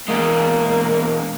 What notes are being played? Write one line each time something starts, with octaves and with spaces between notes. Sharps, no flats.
E2 C#3 G#3 A#3